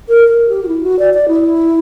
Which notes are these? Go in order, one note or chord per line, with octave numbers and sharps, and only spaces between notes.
A#4
A#4
G4
F#4
E4
F#4
D5
D5
E4